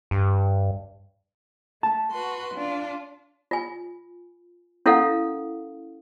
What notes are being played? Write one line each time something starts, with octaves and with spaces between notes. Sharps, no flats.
G2
A3 A5
F#4 B4 C6
D4 F4
F4 G#5
C#4 E4 A4 A#4 F5 F#5